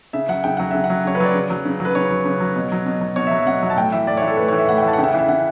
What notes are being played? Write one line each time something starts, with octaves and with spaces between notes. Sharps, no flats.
C#3 E5
F#3 F#5
C#3 G5
F#3 F#5
C#3 E5
F#5
F#3
C#3 C#5
B4
F#3 D5
C#3
F#3
C#3
F#3
B4
C#3 C#5
F#3
C#3
F#3
B2
F#3
B2
F#3
B2 C#5
E5
F#3
E5
B2 F#5
F#3
A5
A2 G5
E3 E5
A2 D5
C#5
E3
A4
A2 B4
E3 C#5
E5
A2 F#5
G5
E3
A5
F#5
C#3 G5
E5
F#5
E3 E5
C#3 F#5